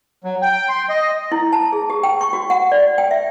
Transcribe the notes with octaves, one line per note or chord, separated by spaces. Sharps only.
F#3
G5
C6
D#5
E4
A5
G#4
G4
G5
C#6
F#4
F#5
D5
G5
E5